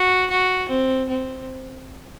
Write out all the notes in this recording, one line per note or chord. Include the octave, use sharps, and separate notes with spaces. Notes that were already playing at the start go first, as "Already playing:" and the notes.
Already playing: F#4
F#4
C4
C4